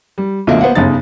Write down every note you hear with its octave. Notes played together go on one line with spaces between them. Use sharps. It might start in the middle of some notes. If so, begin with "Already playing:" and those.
G3
B1 A#2 D3 A3 A#3
A#3 B3 C5 F5 F#5
G1 C#3 D#4 A6